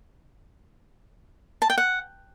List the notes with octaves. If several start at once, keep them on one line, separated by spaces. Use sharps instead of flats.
A5
G5
F#5